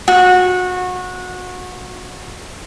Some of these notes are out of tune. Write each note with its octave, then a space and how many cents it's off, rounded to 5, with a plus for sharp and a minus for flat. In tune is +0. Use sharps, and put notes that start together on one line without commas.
F#4 -25